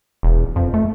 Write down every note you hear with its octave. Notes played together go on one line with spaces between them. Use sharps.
E1
F2
A3